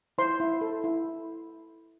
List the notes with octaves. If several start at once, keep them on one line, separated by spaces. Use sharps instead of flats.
E4 C5 C6
E4
A4
E4